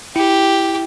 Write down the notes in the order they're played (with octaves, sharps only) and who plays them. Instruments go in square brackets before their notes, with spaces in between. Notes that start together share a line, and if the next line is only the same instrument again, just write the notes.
[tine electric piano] E4 [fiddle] G4